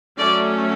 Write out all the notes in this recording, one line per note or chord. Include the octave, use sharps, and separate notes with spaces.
F#3 A3 C#4 D5